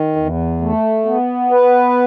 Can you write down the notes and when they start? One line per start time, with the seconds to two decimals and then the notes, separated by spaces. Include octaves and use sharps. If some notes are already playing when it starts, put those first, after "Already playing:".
Already playing: D#3
0.16 E2
0.61 A3
1.06 B3
1.51 B4